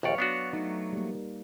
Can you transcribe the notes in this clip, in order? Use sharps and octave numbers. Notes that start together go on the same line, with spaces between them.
A#1 D#2 F#3 B4 C#5 D5 F5
B3 D4 F#4
F#3 A3 D#4
G3 A#3